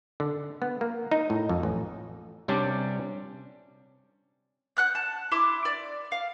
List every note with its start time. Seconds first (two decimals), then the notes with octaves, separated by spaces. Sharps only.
0.20 D3
0.62 B3
0.81 A#3
1.11 D#4
1.30 A2
1.49 F2
1.63 A1
2.48 C3 G3 C#4 D4
4.77 F#5 F#6 G6
4.95 A5
5.32 E4 C6 D6
5.65 D5
6.12 F5